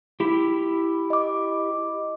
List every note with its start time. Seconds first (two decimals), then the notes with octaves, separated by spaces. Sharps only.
0.20 E4 G4
1.10 D#5 D6